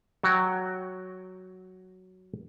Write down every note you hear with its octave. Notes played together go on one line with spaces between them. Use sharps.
F#3 F#4 G5